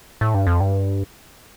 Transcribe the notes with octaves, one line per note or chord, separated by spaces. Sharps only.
A2
G2
F2
G2